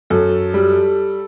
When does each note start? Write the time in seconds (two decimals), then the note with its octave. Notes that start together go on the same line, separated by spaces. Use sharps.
0.10 F#2 A4
0.54 G3